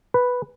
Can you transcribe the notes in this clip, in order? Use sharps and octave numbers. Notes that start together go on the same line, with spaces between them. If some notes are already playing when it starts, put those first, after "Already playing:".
B4